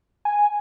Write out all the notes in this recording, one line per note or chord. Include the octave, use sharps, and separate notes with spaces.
G#5